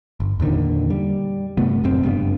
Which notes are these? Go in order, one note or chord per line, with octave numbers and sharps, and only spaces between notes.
G1
E2 A#2 D3 D#3
G3
G1 C3 A3 B3
D#1 F#2 C4
F#1 G2 B3